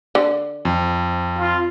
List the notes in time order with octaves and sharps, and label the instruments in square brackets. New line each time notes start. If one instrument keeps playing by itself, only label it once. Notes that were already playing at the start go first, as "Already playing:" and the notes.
[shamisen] D3
[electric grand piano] F2
[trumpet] F4